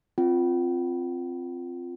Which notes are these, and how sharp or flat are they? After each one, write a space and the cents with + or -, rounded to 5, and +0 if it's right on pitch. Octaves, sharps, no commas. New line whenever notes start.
C4 +0 F4 +0 G5 -45